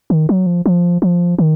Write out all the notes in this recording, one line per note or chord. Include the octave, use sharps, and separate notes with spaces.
D#3
F#3
F3
F3
F3
D#3